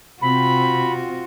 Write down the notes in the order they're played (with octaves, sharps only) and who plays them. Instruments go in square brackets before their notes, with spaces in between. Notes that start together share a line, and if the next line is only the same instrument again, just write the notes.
[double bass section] C3 C4 [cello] F4 F#4 [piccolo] B5